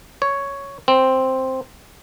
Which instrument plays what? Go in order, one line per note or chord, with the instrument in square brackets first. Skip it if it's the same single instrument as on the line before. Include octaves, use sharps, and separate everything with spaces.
[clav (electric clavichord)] C#5
C4